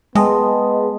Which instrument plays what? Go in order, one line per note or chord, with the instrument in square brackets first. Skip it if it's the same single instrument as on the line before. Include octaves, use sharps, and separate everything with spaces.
[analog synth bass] G#3 [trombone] B3 [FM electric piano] G#4 D#5 [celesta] G5 A5 C6